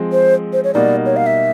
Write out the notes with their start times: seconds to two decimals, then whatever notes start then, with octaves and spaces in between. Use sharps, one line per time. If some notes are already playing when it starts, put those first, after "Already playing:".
Already playing: F3 G#3 C4
0.12 C5
0.53 C5
0.64 C#5
0.74 B2 G3 A#3 D#4 D5
1.06 C#5
1.17 F5
1.26 E5